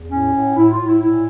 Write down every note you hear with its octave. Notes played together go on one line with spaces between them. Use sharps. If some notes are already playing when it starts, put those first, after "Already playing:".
Already playing: E2
A2 C#4
A2
A2 E4
F4
A2
E4
A#2 E4